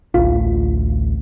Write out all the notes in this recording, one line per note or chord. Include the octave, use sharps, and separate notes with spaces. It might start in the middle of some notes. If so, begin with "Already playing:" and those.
A1 D2 F4